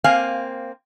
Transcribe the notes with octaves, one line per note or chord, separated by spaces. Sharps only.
A#3 C4 F5 G#5